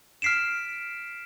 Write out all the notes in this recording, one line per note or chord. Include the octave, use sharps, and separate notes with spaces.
F6 B6 C7 D7 E7